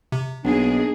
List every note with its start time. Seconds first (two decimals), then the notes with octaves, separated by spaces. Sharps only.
0.12 C3
0.44 B1 A#3 D4 D#4 G#4